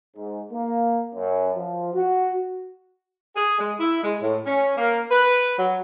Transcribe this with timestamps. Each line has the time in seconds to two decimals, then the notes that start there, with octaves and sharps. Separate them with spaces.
0.16 G#2
0.52 A#3
1.14 F#2
1.56 F3
1.94 F#4
3.35 G#4
3.59 G#3
3.80 E4
4.03 G#3
4.22 A2
4.45 C#4
4.77 A#3
5.10 B4
5.58 F#3